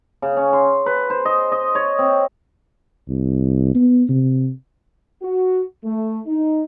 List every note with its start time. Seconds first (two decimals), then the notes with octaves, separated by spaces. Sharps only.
0.22 C#3
0.37 C#4
0.53 C6
0.86 B4
1.10 C5
1.25 D#5
1.52 D#5
1.75 C#5
1.99 C4
3.09 C2
3.75 B3
4.09 C3
5.22 F#4
5.84 A3
6.26 D#4